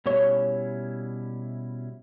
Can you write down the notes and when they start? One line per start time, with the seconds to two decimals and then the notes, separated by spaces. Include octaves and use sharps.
0.06 B2 G3 C#4 E4 C#5